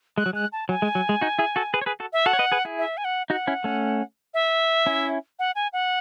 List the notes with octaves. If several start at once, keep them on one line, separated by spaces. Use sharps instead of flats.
G#3 F#6
F#3
G#3 F#6
A5
F#3 G#5
G#3
F#3
G#3
D#4 F#4
E4 G#4
F#4 A4
G#4 B4
C#5
G#4 B4
F#4 A4
E5
F#4 A4 F#5
C#5
B4 D#5
G#4 B4
E4 G#4
E5
G#5
F#5
D#4 F#4 F#5
C#4 E4
A3 C#4
E5
C#4 E4
F#5
G#5
F#5